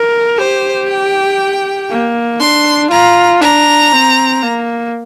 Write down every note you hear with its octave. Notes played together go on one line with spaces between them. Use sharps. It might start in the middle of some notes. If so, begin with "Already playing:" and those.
Already playing: A#4
G4 C5
G5
A#3
D4 C6
F4 A#5
D4 A#5
C4
A#3